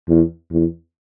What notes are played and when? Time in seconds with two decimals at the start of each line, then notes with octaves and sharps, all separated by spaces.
0.09 E2
0.51 E2